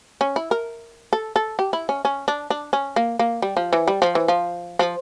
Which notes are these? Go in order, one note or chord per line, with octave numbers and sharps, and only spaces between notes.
C#4
E4
A#4
A4
A4
G4
E4
C#4
C#4
D4
D4
C#4
A#3
A#3
G3
F3
E3
G3
F3
E3
F3
F3